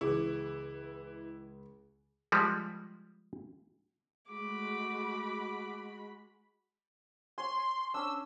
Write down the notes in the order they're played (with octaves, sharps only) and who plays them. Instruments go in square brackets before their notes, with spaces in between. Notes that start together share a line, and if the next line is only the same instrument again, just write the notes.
[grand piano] C#2 D6 [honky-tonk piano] E3 E4 [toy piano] G#4
[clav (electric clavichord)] F3 G3 G#3
[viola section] G#3 F#4 B5 [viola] A3 D6
[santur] C#5 G#5 [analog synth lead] C6
[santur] C#4 D4 [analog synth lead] E6